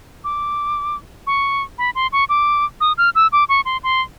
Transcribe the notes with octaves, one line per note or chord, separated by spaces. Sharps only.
D6
C#6
B5
C6
C#6
D6
D#6
F6
E6
D6
C#6
C6
C6